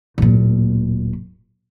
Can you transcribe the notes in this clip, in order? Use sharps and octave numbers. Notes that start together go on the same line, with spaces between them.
D1 A#2